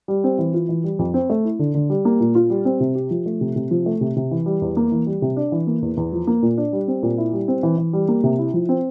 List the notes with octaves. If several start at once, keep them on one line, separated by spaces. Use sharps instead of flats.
G3
C4
E3
F4
E3
G3
F2
C4
A3
E4
D3
D3
G3
A#3
A#2
F4
G3
C4
C3
G4
F3
A3
C3
C3
F3
A3
C3
C3
E3
G3
E2
A#3
E3
G3
C3
D4
E3
A#3
E2
E2
F3
A#3
A#2
D4
G3
C4
A#2
E4
G3
C4
E3
E3
G3
A#3
C3
E4
F3
C4